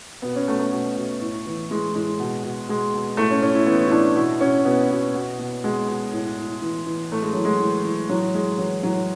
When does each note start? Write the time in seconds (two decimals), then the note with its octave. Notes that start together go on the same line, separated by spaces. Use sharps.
0.22 B2 B3
0.36 C#4
0.48 B2 A3
0.59 A3
0.72 B2
0.96 B2
1.21 A2
1.46 E3
1.70 E3 G#3
1.95 A2 G#3
2.20 B2
2.44 B2
2.69 B2 G#3
2.94 B2
3.17 A2 A3
3.31 C#4
3.42 A2 C#4
3.55 E4
3.66 E3 B3
3.87 E4
3.92 A2 D4
4.16 B2 E4
4.41 B2 C#4
4.65 B2 B3
4.91 B2
5.15 B2
5.39 B2
5.64 B2 G#3
5.89 B2
6.12 A2
6.38 A2
6.62 E3
6.86 E3
7.11 A2 A3
7.22 G#3
7.33 E3 F#3
7.45 G#3
7.60 E3
7.84 E3
8.09 A2 F#3
8.34 A2 G#3
8.58 E3 F#3
8.83 A2 F#3